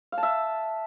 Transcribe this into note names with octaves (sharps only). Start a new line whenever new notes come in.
F5
A5
E5